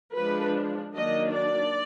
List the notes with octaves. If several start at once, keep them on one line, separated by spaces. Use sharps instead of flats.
F3 G#3 D4 B4
D#3 F#3 A#3 D4 D#5
D5